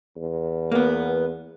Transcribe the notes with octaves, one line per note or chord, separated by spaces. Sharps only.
E2
A#3 B3